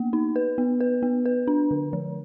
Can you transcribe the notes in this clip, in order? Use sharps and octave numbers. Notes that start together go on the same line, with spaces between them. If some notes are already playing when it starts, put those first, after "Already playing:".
Already playing: A#3 B3
D#4
B4
B3
B4
B3
B4
D4
D3
F3